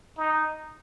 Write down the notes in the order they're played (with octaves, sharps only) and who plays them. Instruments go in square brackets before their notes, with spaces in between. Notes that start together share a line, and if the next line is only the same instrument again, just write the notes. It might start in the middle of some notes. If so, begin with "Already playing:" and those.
[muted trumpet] D#4